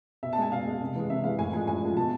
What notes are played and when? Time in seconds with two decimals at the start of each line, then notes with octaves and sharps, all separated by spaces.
0.23 B2 E5
0.33 A5
0.38 G#3 G#5
0.52 B2 F5
0.66 G#3
0.81 C3
0.95 E3 G#3
1.10 C3 E5
1.24 E3 G#3 F5
1.38 A2 G#5
1.53 F3 G#3 G#5
1.67 A2 G#5
1.82 F3 G#3
1.96 B2 A5